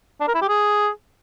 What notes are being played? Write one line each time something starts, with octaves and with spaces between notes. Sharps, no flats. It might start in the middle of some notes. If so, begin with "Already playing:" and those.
D4
A#4
E4
G4
G#4